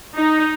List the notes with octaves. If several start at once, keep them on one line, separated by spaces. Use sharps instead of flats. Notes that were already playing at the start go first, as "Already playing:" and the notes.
D#4